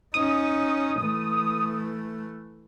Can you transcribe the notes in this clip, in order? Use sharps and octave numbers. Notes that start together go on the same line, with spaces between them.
C#4 D#4 D#6
E3 A3